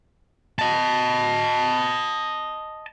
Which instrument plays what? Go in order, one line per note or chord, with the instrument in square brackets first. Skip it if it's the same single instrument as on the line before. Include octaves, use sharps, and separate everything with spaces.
[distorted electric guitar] D#5 A5